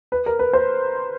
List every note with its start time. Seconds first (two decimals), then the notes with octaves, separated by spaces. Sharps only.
0.12 B4
0.26 A#4
0.39 B4
0.53 C5